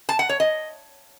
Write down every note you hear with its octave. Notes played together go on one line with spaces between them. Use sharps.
A5
F#5
C#5
D#5